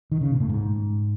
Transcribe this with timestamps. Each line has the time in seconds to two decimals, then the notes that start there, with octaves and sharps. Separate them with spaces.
0.12 D#3
0.21 C#3
0.31 B2
0.40 A2
0.49 G#2